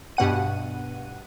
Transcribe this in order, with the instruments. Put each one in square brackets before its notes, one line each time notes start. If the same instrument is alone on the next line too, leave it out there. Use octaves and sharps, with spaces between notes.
[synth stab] G2 B2 F#5 D#7